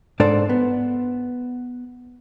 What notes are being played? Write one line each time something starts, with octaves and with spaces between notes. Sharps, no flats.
G#2 D4 A4 C5 D5
B3